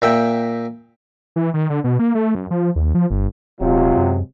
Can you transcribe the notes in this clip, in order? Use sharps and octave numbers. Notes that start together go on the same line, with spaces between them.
A#2 E5 G5
E3
D#3
D3
B2
A#3
A3
F#2
F3
D#2
F3
G1
D#1 C3 F#3 G#3 F4
F#2